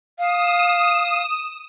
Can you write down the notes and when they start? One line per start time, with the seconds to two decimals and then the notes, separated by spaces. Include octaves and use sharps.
0.19 F5 D#6 E7